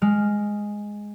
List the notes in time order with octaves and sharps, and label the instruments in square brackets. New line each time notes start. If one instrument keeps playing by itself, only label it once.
[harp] G#3 F6